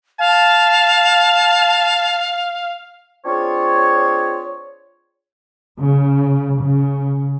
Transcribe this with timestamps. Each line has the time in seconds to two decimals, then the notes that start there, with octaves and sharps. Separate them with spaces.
0.19 F5 A5
3.25 C4 D4 F4 G#4 C#5
5.82 C#3
6.60 C#3